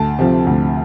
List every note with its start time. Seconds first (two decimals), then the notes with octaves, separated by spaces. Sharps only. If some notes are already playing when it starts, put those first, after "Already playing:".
Already playing: D2 A5
0.19 C3 F3
0.47 D2